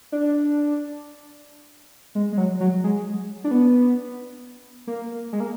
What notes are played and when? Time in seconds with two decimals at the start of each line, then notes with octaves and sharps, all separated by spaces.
0.12 D4
2.15 G#3
2.32 G#3
2.38 F#3
2.60 F#3
2.84 G#3
3.44 D4
3.51 B3
4.87 A#3
5.33 G#3
5.40 A#3